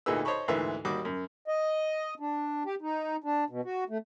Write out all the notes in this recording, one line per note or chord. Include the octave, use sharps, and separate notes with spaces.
D2 A#2 D#4 G#4 B4 E6
C5 C#5 D#5 A5 B5 C#6
D2 G#2 E3 A#3 B4 E5
D#2 G3 F#4 D6 D#6
F#2
D#5
D4
G4
D#4
D4
B2
F#4
A3